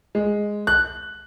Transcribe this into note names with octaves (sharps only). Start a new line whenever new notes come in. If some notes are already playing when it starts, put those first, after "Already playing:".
G#3
F#6